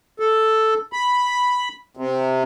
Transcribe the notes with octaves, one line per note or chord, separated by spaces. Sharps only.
A4
B5
C3